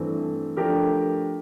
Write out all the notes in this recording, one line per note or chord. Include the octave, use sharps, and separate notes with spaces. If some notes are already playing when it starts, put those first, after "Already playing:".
Already playing: G2 E3 A3 C4
F3 A3 D4 G4 A#4